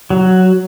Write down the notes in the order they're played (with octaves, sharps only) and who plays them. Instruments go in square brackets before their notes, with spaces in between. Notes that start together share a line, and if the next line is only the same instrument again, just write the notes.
[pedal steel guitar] F#3